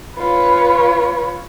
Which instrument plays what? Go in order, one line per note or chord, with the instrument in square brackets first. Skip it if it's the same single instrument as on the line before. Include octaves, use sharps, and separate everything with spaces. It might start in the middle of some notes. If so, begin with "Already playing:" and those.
[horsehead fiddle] F4 C#5 [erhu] B4